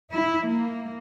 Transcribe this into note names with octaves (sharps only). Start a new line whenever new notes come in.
E4
A#3